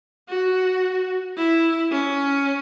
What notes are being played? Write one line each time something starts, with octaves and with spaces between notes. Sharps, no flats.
F#4
E4
C#4